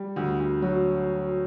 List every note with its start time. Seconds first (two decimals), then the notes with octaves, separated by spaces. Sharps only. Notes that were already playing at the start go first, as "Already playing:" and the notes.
Already playing: G3
0.16 D2
0.40 D2
0.62 F#3